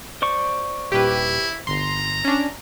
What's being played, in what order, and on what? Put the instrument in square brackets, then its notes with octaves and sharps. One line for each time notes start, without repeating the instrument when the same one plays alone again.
[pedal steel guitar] C5 D5 C#6
[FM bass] D#1 [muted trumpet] E4 [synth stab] G4 B4
[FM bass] G1 [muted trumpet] A#5 [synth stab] C6
[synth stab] C#4 D4